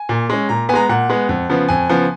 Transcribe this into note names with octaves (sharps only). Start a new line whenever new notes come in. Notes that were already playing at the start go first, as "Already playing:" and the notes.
Already playing: G#5
A#2
G#3 C#4
A#2 A#5
G#3 B3 G#5 A#5
A#2 F#5
G#3 B3
F2
C#3 F3 B3
F2 G#5
C#3 F3 B3